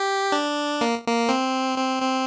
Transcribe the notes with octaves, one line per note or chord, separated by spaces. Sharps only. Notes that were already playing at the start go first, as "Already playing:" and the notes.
Already playing: G4
D4
A#3
A#3
C4
C4
C4